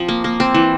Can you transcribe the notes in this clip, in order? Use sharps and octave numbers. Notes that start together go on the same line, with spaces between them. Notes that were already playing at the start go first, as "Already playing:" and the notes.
Already playing: F3 C4
A#3
A#3
C4
E3